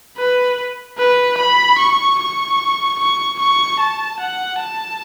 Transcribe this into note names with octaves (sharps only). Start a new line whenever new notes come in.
B4
B4
B5
C#6
C#6
C#6
C#6
A5
F#5
A5